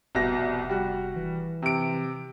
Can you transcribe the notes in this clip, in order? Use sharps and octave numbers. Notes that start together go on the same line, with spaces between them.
F1 C2 B2 A#6
G3 F#4
E3
C3 D7